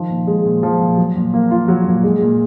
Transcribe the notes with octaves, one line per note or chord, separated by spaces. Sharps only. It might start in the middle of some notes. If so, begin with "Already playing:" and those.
Already playing: D#3 F3
A#2
G#3
A#2
F3
A#2
F#3
A#2
A#3
F4
F#3
A#2
G#3
A#2